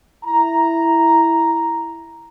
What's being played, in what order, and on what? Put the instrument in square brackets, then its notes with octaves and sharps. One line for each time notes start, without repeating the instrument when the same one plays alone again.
[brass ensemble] E4 A#5